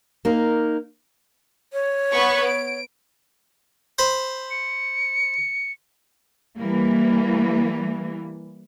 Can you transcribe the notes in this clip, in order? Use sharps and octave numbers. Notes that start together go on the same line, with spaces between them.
A#3 D#4 A#4
C#5
B3 B4 C#6
D7
C5 B5
C#7
E3 G3 A#3